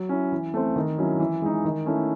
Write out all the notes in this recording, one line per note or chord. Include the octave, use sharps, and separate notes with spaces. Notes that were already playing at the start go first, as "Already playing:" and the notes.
Already playing: F#3
C#4 E4
E3
A3 C4
D#3
F#3 C#4 E4
E3
G#3 D#4
D#3
A3 C#4 E4